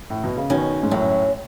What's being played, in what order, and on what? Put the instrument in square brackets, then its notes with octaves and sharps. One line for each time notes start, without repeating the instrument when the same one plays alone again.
[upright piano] A2
B2
C#3
[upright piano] B2 D#3 [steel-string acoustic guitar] C#4
[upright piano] G#2
[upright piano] F#2 A2 [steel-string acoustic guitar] F#3